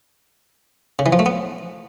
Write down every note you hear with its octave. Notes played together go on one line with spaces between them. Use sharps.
C#3
E3
F3
A3
B3